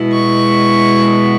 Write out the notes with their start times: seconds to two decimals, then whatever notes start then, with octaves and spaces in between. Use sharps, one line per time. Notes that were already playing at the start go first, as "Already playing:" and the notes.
Already playing: B2 G#3 B3 E4
0.13 C#6